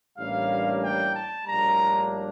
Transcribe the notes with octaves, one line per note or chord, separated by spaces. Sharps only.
A1 A2 G3 A#3 D4 F5
G5
A5
A#1 A2 G3 A#3 D4 A#5